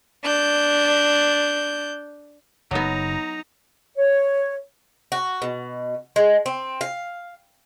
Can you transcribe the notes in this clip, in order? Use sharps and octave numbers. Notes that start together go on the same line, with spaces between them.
D4 G6
F#1 F#3 B3 D#4 A#5
C#5
F#4
B2
G#3
C4
F5